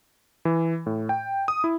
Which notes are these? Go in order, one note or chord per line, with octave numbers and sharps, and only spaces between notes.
E3
A2
G5
D#6
E4